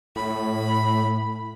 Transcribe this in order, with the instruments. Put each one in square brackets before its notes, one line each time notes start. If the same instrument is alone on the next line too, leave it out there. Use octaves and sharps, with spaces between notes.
[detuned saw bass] A2 [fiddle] B5